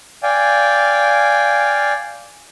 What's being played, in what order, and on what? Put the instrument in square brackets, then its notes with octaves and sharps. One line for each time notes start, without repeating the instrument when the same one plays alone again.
[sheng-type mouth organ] D5 F5 G5 G#5